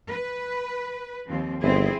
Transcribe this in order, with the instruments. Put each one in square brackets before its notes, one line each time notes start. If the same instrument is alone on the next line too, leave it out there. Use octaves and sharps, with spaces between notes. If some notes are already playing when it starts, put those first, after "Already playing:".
[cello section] B4
D#2 F3 C4
[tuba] G1 [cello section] C4 E4 G#4